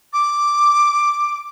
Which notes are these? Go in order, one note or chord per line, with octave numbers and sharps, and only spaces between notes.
D6